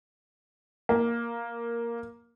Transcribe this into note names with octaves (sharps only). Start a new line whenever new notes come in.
A#3